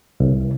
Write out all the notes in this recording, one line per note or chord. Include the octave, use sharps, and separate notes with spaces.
C2